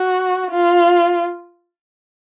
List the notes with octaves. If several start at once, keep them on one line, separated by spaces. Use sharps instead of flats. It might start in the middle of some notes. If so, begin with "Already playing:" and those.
Already playing: F#4
F4